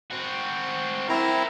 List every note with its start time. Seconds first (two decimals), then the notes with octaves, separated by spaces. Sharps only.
0.11 C4 F#4
1.09 C4 E4 A#4 E5 A#5